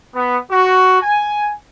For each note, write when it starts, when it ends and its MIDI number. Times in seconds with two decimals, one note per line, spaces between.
0.14 0.37 59
0.51 0.99 66
1.00 1.50 80